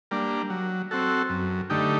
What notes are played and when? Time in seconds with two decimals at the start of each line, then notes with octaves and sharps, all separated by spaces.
0.11 G3 A#3 D4
0.50 F#3
0.91 C4 F#4 A4
1.30 F#2
1.70 D3 A3 D#4 G4